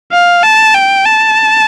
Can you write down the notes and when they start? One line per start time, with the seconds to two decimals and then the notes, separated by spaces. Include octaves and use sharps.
0.12 F5
0.43 A5
0.75 G5
1.06 A5